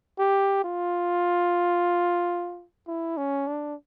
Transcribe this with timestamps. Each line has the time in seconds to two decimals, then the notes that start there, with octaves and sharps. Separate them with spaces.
0.19 G4
0.64 F4
2.87 E4
3.17 C#4
3.47 D4